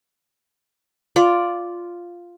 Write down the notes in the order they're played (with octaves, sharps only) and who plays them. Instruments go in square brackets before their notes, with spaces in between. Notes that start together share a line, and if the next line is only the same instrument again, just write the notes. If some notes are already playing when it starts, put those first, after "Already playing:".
[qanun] F4 D5